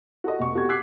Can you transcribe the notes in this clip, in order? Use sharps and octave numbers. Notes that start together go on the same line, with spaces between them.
F#4 A4 D#5
F1 C#6
B2 F#4 G4 A4 C#6 G#6
D6 E6 F#6 G#6 B6 C7